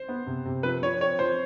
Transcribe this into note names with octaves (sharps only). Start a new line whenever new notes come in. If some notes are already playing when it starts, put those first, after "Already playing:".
Already playing: C5
B3
C3
C3
F3 B4
F3 C#5
C4 C#5
F3 C5